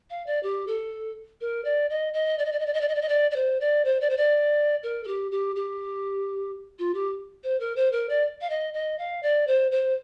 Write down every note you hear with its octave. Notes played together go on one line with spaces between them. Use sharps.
F5
D5
G4
A4
A#4
D5
D#5
D#5
D5
D#5
D5
D#5
D5
D#5
D5
D#5
D5
D#5
D5
D5
C5
D5
C5
D5
C5
D5
A#4
A4
G4
G4
G4
F4
G4
C5
A#4
C5
A#4
D5
F5
D#5
D#5
F5
D5
C5
C5